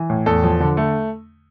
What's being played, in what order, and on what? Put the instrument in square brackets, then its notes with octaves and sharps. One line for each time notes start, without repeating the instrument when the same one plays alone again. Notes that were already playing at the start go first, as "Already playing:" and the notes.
Already playing: [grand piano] E3
A2
E2 A4
F3
D3
A3